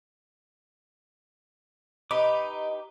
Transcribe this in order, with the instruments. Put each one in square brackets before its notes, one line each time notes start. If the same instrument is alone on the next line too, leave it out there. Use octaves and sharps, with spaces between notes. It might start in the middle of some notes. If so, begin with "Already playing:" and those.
[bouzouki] D#4 [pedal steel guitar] G4 B4 D6